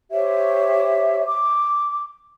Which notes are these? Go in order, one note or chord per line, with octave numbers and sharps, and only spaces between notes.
G4 C5 C#5 E5
D6